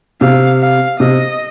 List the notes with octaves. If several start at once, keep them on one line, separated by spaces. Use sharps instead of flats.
C3 F5
F5
C3 D#5